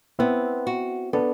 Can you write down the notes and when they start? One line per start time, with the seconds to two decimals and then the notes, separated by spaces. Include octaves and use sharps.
0.19 B3 C4 E4
0.67 F#4
1.13 B3 D4 A4